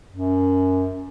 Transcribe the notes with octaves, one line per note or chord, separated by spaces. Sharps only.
F#2